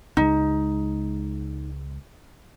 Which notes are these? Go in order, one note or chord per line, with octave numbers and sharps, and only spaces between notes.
C#2 G#3 D#4